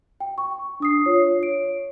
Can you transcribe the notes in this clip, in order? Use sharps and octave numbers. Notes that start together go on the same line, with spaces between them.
G5
C#6
D4 D#6 C7
F4 C#5
C#5 D7